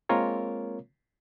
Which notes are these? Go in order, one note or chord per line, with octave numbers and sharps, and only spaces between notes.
G#3 A#3 C4 F4 A#4 C#5